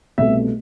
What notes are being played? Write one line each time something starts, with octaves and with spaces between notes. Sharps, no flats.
C2 B2 A3 E5